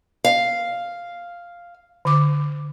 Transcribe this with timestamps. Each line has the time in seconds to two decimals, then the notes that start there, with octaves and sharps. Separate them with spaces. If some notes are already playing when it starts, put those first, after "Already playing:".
0.24 F5
2.05 D3 D6